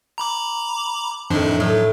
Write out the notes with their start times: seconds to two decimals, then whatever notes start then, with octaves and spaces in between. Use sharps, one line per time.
0.18 A#5 B5 D6
1.30 F2 A2 D#3 F3 D4 C6
1.60 A2 F#3